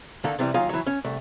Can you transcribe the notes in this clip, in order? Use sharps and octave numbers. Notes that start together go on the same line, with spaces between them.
D3 D#3 A#3 A4
C3 E3 G3
D#2 F#3 D#4 F4 F5 G#5
E3 F#3
C#4
C2 A3